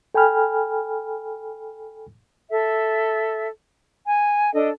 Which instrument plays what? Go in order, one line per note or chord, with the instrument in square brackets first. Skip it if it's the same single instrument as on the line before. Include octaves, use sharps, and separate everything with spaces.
[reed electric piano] A4 G5 G#5 B5 F6
[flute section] A4 E5
G#5
D4 A4 D#5